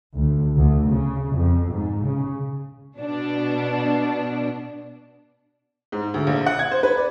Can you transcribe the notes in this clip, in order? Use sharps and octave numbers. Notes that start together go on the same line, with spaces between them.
D2
D2
C#3
F2
G#2
C#3
B2 D4
G#2
D2
A#1
F#5
G#6
C5
B4
D5